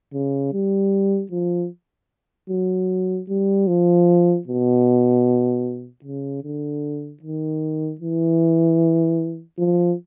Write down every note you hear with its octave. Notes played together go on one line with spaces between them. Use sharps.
C#3
G3
F3
F#3
G3
F3
B2
C#3
D3
D#3
E3
F3